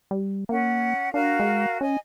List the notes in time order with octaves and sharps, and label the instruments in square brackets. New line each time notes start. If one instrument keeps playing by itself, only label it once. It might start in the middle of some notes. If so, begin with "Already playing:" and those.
[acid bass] G3
[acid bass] A#3 [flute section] C#4 F#5
[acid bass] D4 [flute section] F#4 A#4 F5
[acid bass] G#3
[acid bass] C#4 [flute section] D#5 G#5